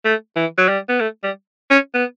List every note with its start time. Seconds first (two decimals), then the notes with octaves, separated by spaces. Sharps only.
0.05 A3
0.36 E3
0.57 F#3
0.68 G3
0.89 B3
1.00 A3
1.23 G3
1.70 C#4
1.94 B3